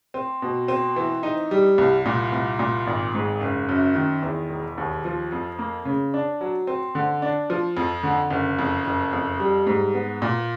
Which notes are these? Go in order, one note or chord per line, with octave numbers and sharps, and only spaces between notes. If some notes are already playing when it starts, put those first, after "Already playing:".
C4
B2
C4
E3
D#4
G3
C2
A#2
C2
A#2
G#1
G#2
F#1
F#2
D#3
E2
E1
D#2
F3
F2
A#3
C#3
D4
F#3
C4
D3
D4
F3
F2
D3
F#1
F2
F#1
F2
G3
G#2
B3
A#2